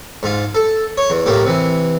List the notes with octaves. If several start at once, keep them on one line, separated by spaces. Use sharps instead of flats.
G#2 F4
A4
C#5
E2
A2 A#3 G4
C3 E3